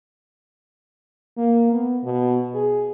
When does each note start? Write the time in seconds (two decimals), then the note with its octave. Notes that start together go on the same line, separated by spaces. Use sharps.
1.38 A#3
1.73 B3
2.03 B2
2.55 G#4